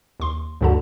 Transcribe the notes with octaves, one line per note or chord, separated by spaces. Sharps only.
D#2 C6
D2 G2 D3 F#4 A5